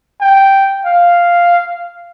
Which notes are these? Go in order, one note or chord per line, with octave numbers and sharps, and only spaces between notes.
G5
F5